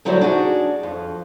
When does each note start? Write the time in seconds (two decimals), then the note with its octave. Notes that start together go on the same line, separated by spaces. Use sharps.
0.05 D3 F#3 G3 E4 F#4 C5
0.21 D4 D#4 F#4 G#4 D5
0.83 F2